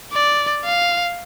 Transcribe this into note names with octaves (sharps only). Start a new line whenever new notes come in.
D5
F5